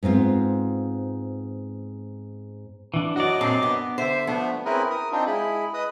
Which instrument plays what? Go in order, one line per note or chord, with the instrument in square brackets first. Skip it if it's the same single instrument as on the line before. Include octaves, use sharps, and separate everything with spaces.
[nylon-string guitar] G#2 B3 C4 F4
[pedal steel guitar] E3 D4
[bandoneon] F#2 F#3 D#5 [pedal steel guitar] F#4 D5
[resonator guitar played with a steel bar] A#2 C4 D4 [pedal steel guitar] D6
[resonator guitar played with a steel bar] B3
[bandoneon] D3 E5 [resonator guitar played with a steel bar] C5
[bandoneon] F3 A3 D4 [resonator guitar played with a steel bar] B3
[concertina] C4 C#4 E4 G#4 A#4 B4
A#4 D#6
C4 D4 D#4 F4
G#3 E4 G#4 B5
B4 D#5 D#6